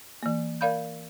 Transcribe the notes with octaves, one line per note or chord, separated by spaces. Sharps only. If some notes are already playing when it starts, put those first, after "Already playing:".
E3 A#3
A#4 D5 F5 B5 G6